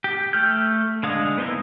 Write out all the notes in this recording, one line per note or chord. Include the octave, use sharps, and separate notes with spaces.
G4
A3 F6 G6
D3 G#3 F5 D#6
B3 C4 D#4 E4 A#4